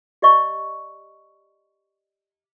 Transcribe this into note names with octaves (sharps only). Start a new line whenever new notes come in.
G4 D5 D#5 C#6